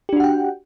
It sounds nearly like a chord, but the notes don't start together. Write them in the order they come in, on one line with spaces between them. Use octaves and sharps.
G4 D4 F#4 F#5 G5